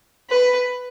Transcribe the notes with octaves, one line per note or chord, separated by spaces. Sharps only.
B4